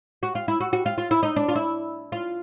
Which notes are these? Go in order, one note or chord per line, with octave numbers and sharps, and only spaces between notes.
F#4
F4
E4
F#4
F#4
F4
F4
E4
D#4
D4
F4
E4
F4